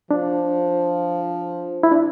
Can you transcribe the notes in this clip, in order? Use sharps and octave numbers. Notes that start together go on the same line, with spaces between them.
F3 D4
E4
D4